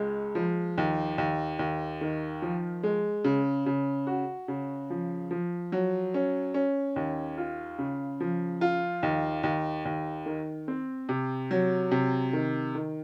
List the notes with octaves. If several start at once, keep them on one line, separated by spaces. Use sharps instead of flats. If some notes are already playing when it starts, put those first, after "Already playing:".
Already playing: C#2 G#3
F3
D#2
D#2
D#2
D#3
F3
G#3
C#3
C#3
F#4
C#3
F3
F3
F#3
C#4
C#4
D#2
F4
C#3
F3
F4
D#2
D#2
D#2
D#3
C4
C3
F#3
C3
D#3
D#3